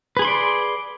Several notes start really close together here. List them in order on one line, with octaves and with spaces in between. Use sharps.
B4 G#4 B5 C6 D5